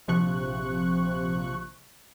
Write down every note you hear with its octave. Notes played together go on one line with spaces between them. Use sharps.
A#1 C3 F3 C#6 F#6